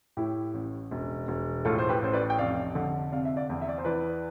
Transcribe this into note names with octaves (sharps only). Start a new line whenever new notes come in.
A2 E4 G4
A1
E1
E1
A2 F4 A4
C5
G4 B4
A1 C5
B4 D5
G5
F1 D5 F5
D3
C3 D5 F5
E5
D5 F5
E2
E5
D5
C5
E3 B4 D5